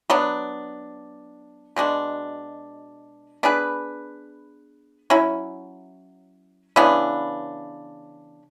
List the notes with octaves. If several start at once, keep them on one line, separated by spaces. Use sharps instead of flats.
F#3 B3 D4
B2 G#3 D4 F#4
B3 D4 G#4 B4
F#3 C#4 E4
C#3 E3 B3 D4